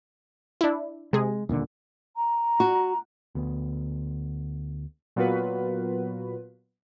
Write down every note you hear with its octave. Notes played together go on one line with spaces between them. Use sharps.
D4 E4
C3 G#3 G#4
D#1 A#2 D3
A#5
F#4
D2 B3
A#2 F#3 B3 F4 F#4 B4